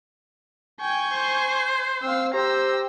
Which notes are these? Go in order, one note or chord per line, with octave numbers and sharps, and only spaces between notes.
G5 G#5 C#6 G6
C5
C4 F5 E6
G4 C5 A#5 E6